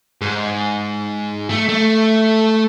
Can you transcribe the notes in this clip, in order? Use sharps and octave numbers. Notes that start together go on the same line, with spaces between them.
G#2
A3
A3